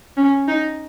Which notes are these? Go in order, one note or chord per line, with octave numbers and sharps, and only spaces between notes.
C#4
D#4